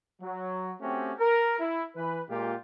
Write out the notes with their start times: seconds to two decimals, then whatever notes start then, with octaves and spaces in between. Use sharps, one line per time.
0.21 F#3
0.80 A3 C4 C#4 F#4 G4
1.18 A#4
1.59 E4
1.96 E3 B4
2.29 A#2 G#3 F4 G4